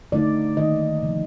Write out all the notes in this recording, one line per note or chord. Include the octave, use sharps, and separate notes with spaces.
D3 A3 D#4 D5
D#3 A#3 D#4 D#5
C3 F3 A#3